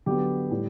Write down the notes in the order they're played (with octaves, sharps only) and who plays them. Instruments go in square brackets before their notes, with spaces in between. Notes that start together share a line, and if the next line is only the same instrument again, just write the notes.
[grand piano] D3 F#3 B3 G4
A2 G3